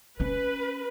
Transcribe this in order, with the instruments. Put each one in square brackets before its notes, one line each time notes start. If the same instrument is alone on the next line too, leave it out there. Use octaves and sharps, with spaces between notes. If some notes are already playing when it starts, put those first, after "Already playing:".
[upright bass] C#4 [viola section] B4